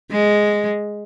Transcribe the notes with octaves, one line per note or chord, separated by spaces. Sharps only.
G#3